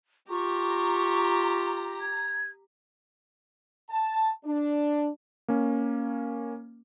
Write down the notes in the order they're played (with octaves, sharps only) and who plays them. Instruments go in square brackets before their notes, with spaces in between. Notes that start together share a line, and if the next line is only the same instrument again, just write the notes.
[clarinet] F4 [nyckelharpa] G4 [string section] A#5 [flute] C#6
[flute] G#6
[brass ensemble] A5
D4
[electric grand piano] A#3 C#4